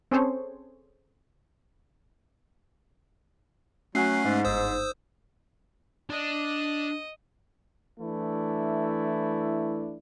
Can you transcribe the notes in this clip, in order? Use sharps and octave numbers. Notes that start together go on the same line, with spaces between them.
C4 C#4 G#4 A4 C5 C#5
F#3 A3 C#4 G#5 F#6 C7
G#2
G1 D#4 C5 D#6 E6
D4 D#5
E3 A3 D4 E4